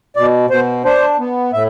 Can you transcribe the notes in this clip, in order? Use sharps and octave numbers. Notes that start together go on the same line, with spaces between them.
B2 D5
B2 C5
D4 C5
B3
A2 E5